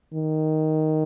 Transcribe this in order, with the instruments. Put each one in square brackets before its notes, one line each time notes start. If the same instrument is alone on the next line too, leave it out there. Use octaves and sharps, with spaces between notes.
[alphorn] D#3